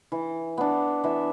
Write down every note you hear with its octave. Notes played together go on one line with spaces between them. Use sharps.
E3
B3 D4
E3 E5